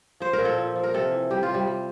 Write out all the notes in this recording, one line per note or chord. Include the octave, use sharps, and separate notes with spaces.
F3 C5
A#4
A#2
A4
F3
F3
A#4
C3 A4
E3
G3 G4
F4
C3
G3
G3